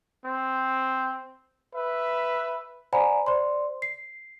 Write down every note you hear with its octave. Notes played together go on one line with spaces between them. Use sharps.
C4
B4 E5
C5 D5 F#5 G#5 A#5 B5
C5 D5 C6
C7